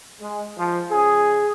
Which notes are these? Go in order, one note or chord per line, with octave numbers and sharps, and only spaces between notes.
G#3
F3
C#3 G#4